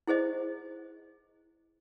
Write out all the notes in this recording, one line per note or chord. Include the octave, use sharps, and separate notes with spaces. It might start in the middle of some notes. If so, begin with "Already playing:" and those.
E4 G#4 C5 D#5